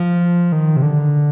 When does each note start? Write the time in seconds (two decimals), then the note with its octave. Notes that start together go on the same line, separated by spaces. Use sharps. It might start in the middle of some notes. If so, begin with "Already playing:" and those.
Already playing: F3
0.52 D#3
0.77 C3
0.82 D3